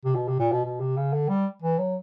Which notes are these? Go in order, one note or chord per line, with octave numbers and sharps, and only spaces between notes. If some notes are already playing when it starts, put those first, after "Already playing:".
C3
B2
C3
A#2
B2
B2
C3
C#3
D3
G3
E3
F#3